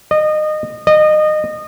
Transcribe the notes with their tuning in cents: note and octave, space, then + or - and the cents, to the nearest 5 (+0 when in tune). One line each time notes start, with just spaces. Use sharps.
D#5 -25
D#5 -25